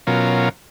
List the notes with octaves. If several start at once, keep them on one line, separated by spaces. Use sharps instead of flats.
B2 F#3 C#4 F4 A#4